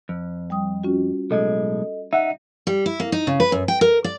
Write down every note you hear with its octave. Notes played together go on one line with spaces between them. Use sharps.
F2
G3 G5 D#6
C#4 F4 F#4
B1 A2 G#3 A4 D#5
D#4 E5 F#5
G3
E4
A#3
D#4
C#3
B4
F#2
G5
A#4
D5